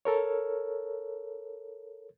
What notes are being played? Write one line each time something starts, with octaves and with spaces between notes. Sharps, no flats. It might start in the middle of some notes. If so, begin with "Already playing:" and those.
A4 A#4 C#5